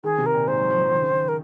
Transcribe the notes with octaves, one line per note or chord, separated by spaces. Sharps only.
D#3 G#4
C3
A#4
A#2
G#2 C5
F#3
F3
F3
D#3
C#3
D#3
A#4